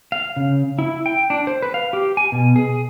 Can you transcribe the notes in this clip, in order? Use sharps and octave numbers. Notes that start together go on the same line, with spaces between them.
F5
C#3
E4
G5
D4
C5
B4
F5
G4
G#5
B2
G#4